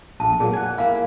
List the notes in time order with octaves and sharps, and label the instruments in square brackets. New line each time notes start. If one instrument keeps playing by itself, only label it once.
[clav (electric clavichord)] A#1 [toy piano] A5
[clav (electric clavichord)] A#2 F#3 [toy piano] G#4
[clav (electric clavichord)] F#5 G#5
[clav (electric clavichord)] A#3 E4 [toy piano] F5